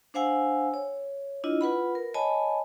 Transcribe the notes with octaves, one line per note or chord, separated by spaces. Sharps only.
D4 C5 F5 F#5 G#5 E6
C#5
D4 E4 F4 D#5
F4 B4 F#5 B5
A#4
C#5 D#5 G#5 A5 B5